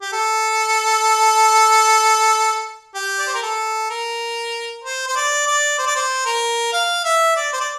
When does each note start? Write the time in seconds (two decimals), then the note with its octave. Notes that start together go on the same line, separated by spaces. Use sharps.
0.02 G4
0.13 A4
2.95 G4
3.19 D5
3.27 C5
3.35 A#4
3.43 A4
3.90 A#4
4.84 C5
5.08 C5
5.16 D5
5.47 D5
5.79 C5
5.87 D5
5.96 C5
6.26 A#4
6.73 F5
7.05 E5
7.37 D5
7.53 C5
7.61 D5